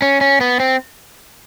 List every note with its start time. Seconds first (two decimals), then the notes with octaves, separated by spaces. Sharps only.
0.02 C#4
0.21 C#4
0.41 B3
0.60 C4